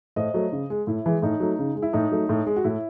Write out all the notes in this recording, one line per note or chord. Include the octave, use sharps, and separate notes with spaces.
A2 C5 D#5
F#3 A3
C#3
G#3
A2 E4
E3 G#3
A2 D#4
F#3 A3
C#3
G#3
E4
A2 D#4
F#3 A3
A2
G#3
F#4
A2 E4